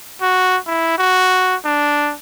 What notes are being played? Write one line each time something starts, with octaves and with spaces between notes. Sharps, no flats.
F#4
E4
F#4
D4